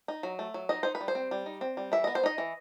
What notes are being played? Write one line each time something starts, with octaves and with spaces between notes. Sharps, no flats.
D#4
F#3
A3
F#3
D#4 D#5
D#4 C5
B4
G3
C5
C4
G3
D#4
C4
G3
E3 E5
B3 D#5
C5
D#4 D#5
E3